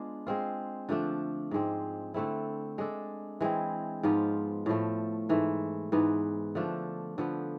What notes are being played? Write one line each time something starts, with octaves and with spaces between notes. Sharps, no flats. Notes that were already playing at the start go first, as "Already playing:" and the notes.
Already playing: G#3 B3 D4 F4
G#3 C4 F4
D3 F3 A3 D4
G#2 G#3 C4
D3 A3 C4 E4
G#3 D4 A4
E3 G#3 C4
G#2 F3 B3 F4
A2 F3 A3
G#2 E3 A3
G#2 E3 B3
D3 F3 A3 D4
D3 F3 B3